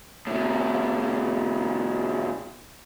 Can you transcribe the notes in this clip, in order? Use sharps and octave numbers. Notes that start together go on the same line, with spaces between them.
A2 C3